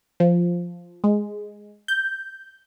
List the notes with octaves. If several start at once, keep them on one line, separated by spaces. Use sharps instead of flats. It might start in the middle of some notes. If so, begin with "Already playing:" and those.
F3
G#3
G6